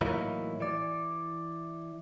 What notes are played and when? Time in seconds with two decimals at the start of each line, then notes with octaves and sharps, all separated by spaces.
0.01 A2 E3 F#3 A#3 D#4 E4
0.60 E3 D5